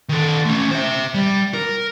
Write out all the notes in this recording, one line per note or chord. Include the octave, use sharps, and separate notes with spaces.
D#3 A4
A3 C#4
C5 E5
G3
A#4